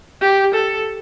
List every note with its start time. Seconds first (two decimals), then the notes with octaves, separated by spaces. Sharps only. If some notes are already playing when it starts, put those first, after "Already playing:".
0.22 G4
0.54 A4